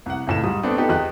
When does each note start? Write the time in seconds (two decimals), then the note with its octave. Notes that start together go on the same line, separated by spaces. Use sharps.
0.06 C2 F#5
0.27 C#2 A2 E7
0.43 G#2 G3 D#6
0.63 A3 B3 C4 D4
0.77 B3 D#4 G4 A4
0.89 E2 G4 D#5 F#6